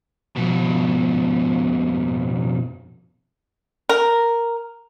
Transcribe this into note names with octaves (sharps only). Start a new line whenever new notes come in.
F2 B2
A#4